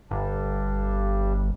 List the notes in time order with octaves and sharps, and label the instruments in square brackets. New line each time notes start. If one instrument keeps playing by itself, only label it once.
[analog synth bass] G1 [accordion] G2 G3 D4